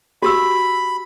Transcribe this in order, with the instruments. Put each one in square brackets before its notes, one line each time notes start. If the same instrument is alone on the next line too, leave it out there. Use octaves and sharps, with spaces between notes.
[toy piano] F#4 G4 E6 [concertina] B5